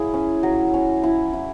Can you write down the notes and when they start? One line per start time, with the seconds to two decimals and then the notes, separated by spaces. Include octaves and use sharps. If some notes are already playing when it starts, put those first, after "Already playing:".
Already playing: F#3 E4 G#4 E5
0.14 C#4
0.43 F#3
0.74 C#4
1.03 E4
1.33 E4